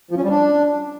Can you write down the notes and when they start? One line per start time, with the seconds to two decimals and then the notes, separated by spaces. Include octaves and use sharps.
0.11 F3
0.17 C#4
0.24 G3
0.30 D4